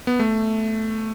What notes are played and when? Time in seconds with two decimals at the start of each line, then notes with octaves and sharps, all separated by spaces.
0.07 B3
0.20 A3